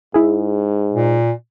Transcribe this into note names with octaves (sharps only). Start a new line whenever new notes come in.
G#2 E4 G#4
A#2